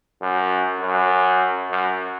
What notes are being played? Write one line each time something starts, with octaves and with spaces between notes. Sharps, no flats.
F#2
F#2
F#2